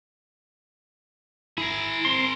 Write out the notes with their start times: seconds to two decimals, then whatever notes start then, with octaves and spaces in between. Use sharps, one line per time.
1.58 E4 G#4 A#4
2.05 C4 C6